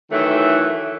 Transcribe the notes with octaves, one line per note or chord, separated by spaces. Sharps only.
D#3 E3 F#3 A3